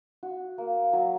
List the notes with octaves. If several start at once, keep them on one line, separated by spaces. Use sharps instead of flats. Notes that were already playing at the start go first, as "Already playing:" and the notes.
F#4
A#3
F#3